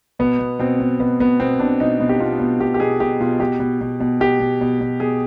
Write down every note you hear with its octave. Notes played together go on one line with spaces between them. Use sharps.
B2 B3
B2
B2 C4
B2
B2 B3
B2 B3
B2 C4
B2 D4
B2 D#4
B2
G4
B2 F4
B2
B2 G4
G4
B2 G#4
B2 G4
B2 F4
B2 G4
B2
B2
B2
B2 G4
B2
B2
B2
B2 G#4